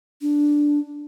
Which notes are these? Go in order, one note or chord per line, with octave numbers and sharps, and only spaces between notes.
D4